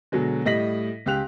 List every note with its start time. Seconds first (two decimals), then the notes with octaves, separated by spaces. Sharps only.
0.12 B2 D3 F#3 G#3
0.45 A2 G3 D#5 A#6 B6 F#7
1.06 C#2 G4 F#6 F7